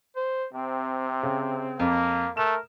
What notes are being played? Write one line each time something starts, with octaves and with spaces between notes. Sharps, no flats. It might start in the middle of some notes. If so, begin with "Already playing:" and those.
C5
C3 C4
C#3
F2 A#3
A3 A#4 E7